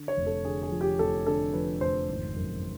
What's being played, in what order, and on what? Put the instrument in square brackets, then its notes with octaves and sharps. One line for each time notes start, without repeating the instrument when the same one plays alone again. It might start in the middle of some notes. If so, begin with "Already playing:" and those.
Already playing: [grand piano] D3
C#5
F1
A4
D3 G#4
G#4
F3
G4
F1 A4
D3 A4
F3 B4
F1 C5
G#1
F#2